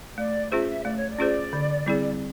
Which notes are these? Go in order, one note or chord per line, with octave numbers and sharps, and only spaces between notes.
A3 D5
C#4 F4 G#4 C5 E5
A3 D5
C#5
D5
C#4 F4 G#4 C5
D3
G3 C4 E4 G#4